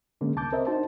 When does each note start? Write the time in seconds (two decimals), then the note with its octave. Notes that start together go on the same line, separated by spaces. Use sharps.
0.21 D3 G#3 A#3 C#4
0.36 C2 A5 D6 G6
0.52 C4 A#4 C5 D#5 E5
0.67 D4 D#4 F#4 C5 A5